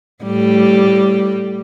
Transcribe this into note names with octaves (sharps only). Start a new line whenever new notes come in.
A2 G3